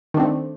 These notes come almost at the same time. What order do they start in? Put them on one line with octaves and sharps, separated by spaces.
D#3 D4 C4 A3